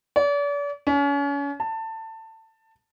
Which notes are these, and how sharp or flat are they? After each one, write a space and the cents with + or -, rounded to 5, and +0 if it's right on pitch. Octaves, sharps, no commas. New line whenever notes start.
D5 -40
C#4 +35
A5 +20